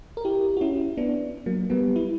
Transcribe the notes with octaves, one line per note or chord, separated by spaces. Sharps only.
A#4
E4 G4
F#4
C#4 E4
B3 D4
F#3 A#3
G3 B3
E4